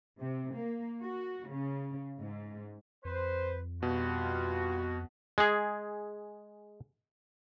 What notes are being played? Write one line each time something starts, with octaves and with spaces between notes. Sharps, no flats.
C3
A#3
F#4
C#3
G#2
F2 B4 C5
B2 G3 F4 F#4
G#3 G#4